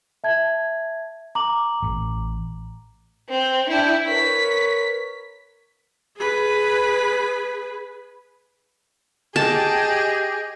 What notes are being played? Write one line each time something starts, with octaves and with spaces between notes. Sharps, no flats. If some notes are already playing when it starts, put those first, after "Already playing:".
E5 A5 G#6
A#5 D6 F#7
A1
C4
D4 E4 G5
A#4 B4 C#5 B6
G#4 B4
G4 G#4 D#5 A5